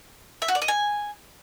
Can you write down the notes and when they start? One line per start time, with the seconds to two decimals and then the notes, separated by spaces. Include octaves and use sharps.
0.42 E5
0.48 F#4
0.55 D5
0.62 D#5
0.68 G#5